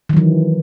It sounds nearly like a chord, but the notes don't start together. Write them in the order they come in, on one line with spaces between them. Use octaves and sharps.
D#3 F#3 E3